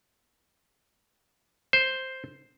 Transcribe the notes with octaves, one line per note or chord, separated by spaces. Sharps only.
C5